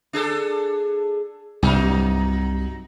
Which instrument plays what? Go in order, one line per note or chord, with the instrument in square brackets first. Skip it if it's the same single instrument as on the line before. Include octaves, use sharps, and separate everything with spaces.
[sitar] D4 G#4 A4
[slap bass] C2 G2 [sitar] F#3 D#4